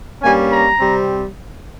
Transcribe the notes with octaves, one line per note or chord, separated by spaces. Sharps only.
G2 G3 A#3 C#4 G#5
A#5
C3 G3 C4